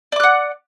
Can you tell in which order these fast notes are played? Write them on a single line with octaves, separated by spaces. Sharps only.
D5 D6 F#6 F#5